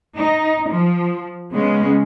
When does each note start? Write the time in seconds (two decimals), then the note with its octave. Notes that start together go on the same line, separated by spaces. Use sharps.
0.15 D#4
0.69 F3
1.51 C#3 G#3 B3 C#4